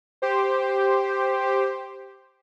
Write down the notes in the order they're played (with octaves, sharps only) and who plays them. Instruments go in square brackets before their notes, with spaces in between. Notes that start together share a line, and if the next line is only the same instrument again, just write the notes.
[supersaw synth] G4 C5